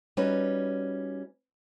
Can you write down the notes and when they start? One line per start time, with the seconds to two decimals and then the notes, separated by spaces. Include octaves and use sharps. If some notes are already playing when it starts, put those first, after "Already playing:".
0.17 G3 C#4 D#4 F#4 B4